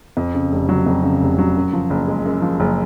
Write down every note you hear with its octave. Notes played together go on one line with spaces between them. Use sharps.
F2
C#3
F1
F#3
F2
C#3
F1
F#3
F#2
F3
F#1
G#3
F#2
F3
F#1